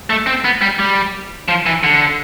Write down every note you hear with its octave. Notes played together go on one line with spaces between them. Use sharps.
A3
C4
B3
G3
G3
F3
E3
D3